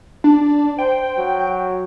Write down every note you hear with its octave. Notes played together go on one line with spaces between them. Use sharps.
D4
C5 G5
F#3